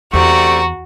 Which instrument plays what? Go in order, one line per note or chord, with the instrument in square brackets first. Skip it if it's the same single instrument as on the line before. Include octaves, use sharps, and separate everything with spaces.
[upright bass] E2 [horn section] C3 A3 D5 [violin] F#4 [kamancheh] A#5 C#6